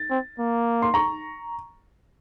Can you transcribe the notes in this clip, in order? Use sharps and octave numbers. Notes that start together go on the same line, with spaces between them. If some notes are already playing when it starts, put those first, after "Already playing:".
Already playing: A6
C4
A#3
C6
A#5 C#6